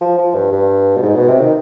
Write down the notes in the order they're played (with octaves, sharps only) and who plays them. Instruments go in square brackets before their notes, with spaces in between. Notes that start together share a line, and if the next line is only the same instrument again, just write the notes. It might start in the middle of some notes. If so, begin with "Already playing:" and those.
[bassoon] F3
F3
G2
G2
B2
G#2
B2
C3
D#3